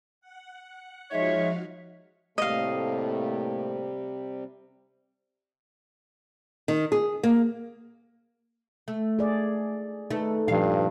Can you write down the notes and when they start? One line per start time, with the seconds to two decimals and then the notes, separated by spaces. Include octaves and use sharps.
0.21 F#5
1.11 F3 G#3 D#4 F#4 C#5 E5 F5
2.38 A2 C3 G3 A3 A#3 D#5 F5
6.68 D#3
6.92 G#4
7.23 A#3
8.88 A3
9.19 G#4 D5
10.10 A3 D#4 A4 B4
10.48 G2 A#2 F3 F5